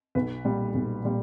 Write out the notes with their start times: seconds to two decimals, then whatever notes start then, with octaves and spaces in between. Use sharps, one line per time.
0.15 B1 B4
0.45 A#2 G3
0.74 B1
1.05 A#2 G3